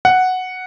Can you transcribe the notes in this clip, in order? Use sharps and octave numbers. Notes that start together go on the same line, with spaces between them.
F#5